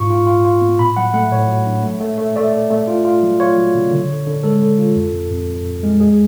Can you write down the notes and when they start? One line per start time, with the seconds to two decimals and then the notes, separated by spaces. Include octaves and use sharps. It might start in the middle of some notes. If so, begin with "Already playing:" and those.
Already playing: G#2 F4 C#6
0.10 F4
0.27 F4
0.45 F4
0.61 B3
0.79 A2 B5
0.97 F#3 F#5
1.14 A3 F#5
1.31 A2 C#5
1.48 F#3
1.67 D4
1.84 A3
2.00 A3
2.18 A3
2.36 A3 D5
2.53 A3
2.71 A3
2.88 F4
3.05 F4
3.23 F#3
3.40 F4 C#5
3.57 F#3
3.75 C#3
3.91 D3
4.09 D3
4.27 D3
4.44 G#3 A4
4.62 D3
4.79 F4
4.96 F2
5.13 F2
5.32 F2
5.48 F2
5.65 F2
5.83 G#3
6.00 G#3 G#4